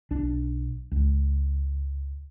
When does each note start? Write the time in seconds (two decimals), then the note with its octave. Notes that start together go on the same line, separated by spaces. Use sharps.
0.11 B1 D4
0.91 C#2